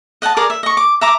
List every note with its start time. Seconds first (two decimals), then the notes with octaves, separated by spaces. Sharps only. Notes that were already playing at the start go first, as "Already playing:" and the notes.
0.22 D#5 F#5 G5 A5
0.37 G#4 A#4 D5
0.50 E5
0.63 D#5 C#6
0.77 D6
1.01 E5 A#5 D6